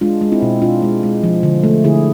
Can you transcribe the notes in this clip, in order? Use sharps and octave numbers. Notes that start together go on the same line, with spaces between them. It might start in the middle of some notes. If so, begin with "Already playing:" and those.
G#3 D4 F4
G#3
C4 E4
B2
B2 D4 F4
G#3
G#3
F3
D3
A3
D3 E4 G#4